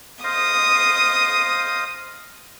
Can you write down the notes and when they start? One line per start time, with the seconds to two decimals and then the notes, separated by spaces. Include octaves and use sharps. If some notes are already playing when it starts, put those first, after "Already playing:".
0.24 C5 D#5 F5 D#6